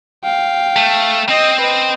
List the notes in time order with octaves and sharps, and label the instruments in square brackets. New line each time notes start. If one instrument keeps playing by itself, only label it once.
[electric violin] F5 G5
[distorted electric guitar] A3
[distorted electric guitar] C4 [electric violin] D#5
[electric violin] B4 D#5